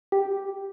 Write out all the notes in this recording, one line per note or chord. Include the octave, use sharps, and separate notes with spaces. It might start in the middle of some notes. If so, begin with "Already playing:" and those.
G4